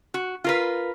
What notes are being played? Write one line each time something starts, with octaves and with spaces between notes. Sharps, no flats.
F#4
F4 A#4 B4